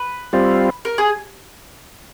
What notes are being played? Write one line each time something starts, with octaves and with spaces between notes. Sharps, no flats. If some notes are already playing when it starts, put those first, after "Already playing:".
Already playing: B4
G3 C4 F4
A#4
G#4